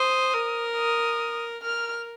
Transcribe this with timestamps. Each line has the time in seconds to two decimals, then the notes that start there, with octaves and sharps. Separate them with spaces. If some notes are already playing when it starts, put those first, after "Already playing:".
Already playing: C5 D#6
0.33 A#4
0.76 D#6
1.63 A#4 F6